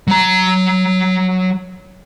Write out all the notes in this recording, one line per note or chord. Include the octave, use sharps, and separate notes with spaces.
F#3 A#5